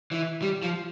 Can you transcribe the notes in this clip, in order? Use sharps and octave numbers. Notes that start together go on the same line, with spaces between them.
E3
G3
F3